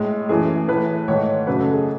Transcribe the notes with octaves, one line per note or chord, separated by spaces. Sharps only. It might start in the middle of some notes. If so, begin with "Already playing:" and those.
Already playing: A2 G#3
F#2 E3 A3 G#4
A2 E3 A3 B4
G#2 D#3 A3 C#5
F#2 C#3 F#3 A3 B4
A4
G#4